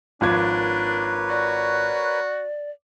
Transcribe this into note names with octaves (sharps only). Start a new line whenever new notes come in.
G#1 F3 D4 A#4 B4 C#5 G#6
F#4 D5